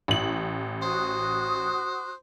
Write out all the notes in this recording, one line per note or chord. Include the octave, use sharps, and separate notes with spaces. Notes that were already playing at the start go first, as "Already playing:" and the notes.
A1 F#7
F#4 C5 D#6 F#6